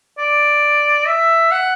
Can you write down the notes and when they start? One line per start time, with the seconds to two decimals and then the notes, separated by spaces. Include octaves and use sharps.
0.18 D5
1.07 E5
1.51 F#5